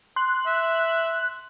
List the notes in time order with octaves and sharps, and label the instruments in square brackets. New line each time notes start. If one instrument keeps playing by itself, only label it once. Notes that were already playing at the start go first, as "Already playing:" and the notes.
[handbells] C6 [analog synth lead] F#6
[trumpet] E5